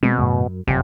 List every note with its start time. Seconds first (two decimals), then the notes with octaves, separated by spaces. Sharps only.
0.03 B2 G#3 C4
0.18 F#2 A2 C#3
0.47 F#2
0.67 F#1 F2 C3